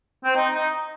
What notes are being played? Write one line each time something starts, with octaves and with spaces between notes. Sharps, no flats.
C4
D#4
D#4